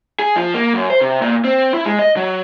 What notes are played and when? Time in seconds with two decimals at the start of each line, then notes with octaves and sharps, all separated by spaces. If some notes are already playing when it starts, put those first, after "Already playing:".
0.19 G#4
0.36 F3
0.54 A#3
0.74 F#2
0.90 C5
1.01 C3
1.22 A#2
1.44 C4
1.74 E4
1.85 G#3
1.99 D#5
2.17 F#3